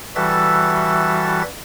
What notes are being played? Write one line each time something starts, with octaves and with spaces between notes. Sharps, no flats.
E3 G3 F#4 A4 E5 A6